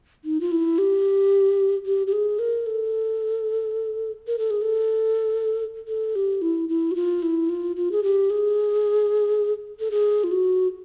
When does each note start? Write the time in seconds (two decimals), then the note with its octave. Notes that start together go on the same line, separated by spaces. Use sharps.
0.25 D#4
0.41 F4
0.52 E4
0.78 G4
1.86 G4
2.07 G4
2.13 G#4
2.39 A#4
2.66 A4
4.27 A#4
4.39 A4
4.50 G#4
4.62 A4
5.88 A4
6.16 G4
6.42 E4
6.69 E4
6.91 F#4
6.96 F4
7.23 E4
7.49 F4
7.76 F4
7.92 G#4
8.03 G4
8.30 G#4
9.80 A4
9.91 G#4
10.24 F4
10.32 F#4